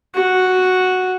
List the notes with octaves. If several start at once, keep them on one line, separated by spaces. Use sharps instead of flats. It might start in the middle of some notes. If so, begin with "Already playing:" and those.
F#4